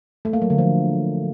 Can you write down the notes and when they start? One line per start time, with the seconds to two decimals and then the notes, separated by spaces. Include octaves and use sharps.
0.25 A3
0.33 A#3
0.42 F#3
0.50 D3
0.58 F3